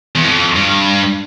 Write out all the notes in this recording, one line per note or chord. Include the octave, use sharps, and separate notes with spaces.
E2
F2
G2